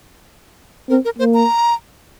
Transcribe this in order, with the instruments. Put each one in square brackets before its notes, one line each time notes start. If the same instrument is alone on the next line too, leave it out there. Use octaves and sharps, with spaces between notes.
[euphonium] C4 [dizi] A#4
[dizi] A#4
[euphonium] A#3 [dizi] C5
[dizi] A#5